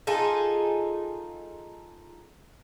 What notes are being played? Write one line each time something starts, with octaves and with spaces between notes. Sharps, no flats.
D#4 F4 G#4 A4